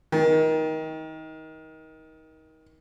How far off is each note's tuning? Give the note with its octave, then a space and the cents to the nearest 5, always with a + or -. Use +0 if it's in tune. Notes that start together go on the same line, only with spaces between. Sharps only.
D#3 +25